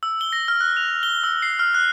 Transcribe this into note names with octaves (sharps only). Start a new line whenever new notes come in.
E6
G7
A#6
F6
F#6
F7
G7
E6
C7
F6
F#6